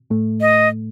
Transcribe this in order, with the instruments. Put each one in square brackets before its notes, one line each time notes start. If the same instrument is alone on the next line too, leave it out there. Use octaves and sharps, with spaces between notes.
[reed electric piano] A2 A3
[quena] D#5